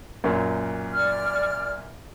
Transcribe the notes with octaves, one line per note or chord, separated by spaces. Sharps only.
F#2 A#2
D5 F6